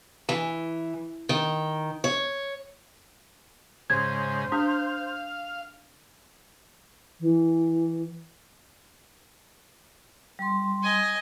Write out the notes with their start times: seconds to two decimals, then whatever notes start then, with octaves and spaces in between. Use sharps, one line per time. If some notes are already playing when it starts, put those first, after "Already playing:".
0.29 E3
1.29 D#3
2.04 C#5
3.90 G#2 C#3 C5 G#6
4.52 D4 F5 D#6
7.20 E3
10.39 G3 C6
10.83 D#5 G#5